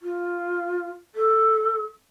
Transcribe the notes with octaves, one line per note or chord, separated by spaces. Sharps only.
F4
A4